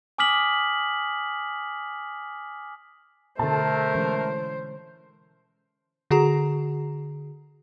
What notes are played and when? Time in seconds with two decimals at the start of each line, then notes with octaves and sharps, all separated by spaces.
0.18 G#5 D6 D#6 F6 B6 F#7
3.39 B2 D3 A3 A#4 C5 A5
3.95 E3 G#3 C#4
6.11 D3 F#4 G#4 A#5